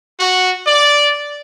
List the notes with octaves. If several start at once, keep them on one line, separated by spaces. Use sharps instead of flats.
F#4
D5